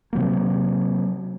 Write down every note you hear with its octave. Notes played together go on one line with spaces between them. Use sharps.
C3 F#3 A#3